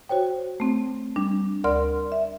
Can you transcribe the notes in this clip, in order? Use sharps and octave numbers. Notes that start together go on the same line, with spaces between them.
F#4 C5 C#5 G5
A3 C4
G3 D4
D2 A#4 D5 C6 F6
E5